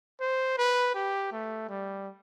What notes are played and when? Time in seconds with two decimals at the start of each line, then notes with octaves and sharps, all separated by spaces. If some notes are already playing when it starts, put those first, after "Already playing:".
0.21 C5
0.58 B4
0.95 G4
1.32 A3
1.69 G3